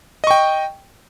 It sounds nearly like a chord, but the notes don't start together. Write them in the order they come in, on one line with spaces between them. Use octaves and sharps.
D#5 C#6 G5